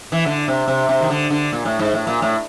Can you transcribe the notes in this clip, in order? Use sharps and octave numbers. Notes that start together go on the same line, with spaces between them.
E3
D3
C3
C3
C3
D#3
D3
D3
A#2
A2
G#2
A2
A#2
A2